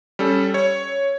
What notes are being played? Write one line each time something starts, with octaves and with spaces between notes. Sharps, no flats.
G3 C#4 A4
C#5